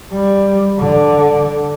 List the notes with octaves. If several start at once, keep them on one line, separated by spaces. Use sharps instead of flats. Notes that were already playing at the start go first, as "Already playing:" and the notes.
G3
D3